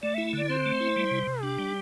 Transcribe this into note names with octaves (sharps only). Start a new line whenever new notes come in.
A3 D5
E4 E5
D3 D5
C4 C5
A3
E4
G3
C3
C3
D4 G4
G3